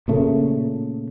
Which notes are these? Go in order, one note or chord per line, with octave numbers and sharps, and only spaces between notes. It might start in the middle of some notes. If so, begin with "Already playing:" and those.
A#2 C#3 A3